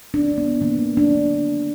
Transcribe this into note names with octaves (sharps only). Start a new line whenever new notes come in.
D4
G#3
B3
D#3 A#3
F#3 A#3 D4